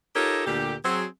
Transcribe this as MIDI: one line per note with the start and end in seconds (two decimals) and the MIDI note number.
0.15 0.45 63
0.15 0.45 65
0.15 0.45 67
0.15 0.45 69
0.15 0.45 70
0.15 0.45 73
0.46 0.75 38
0.46 0.75 46
0.46 0.75 50
0.46 0.75 67
0.84 1.05 54
0.84 1.05 60
0.84 1.05 68